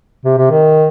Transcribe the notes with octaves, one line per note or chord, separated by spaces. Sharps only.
C3
C3
D#3